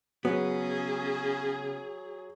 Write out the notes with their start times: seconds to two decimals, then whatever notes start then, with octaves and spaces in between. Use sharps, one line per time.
0.25 C#3 F#3 B3 G#4